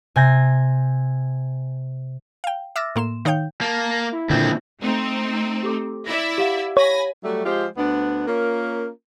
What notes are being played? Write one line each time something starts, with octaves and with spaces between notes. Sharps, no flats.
C3 G#5 G6 A#6
F5 G5
E5 D6 E6 F6 A6 A#6
A2 A#3 C6 E7
D#3 D#4 C#5 F5 G5 G6
A#3 A5
E4
D#2 A#2 D3 C4
A3 C4 D#4
G4 A4 D6
E4 D5 E5 A#6
G4 F5 F#5
C#5 G#5 B5 A#6
F#3 G3 A3
F3 G#3 F4 G4 C5
D2 B3 D4
A#3 C#4 F4 A#4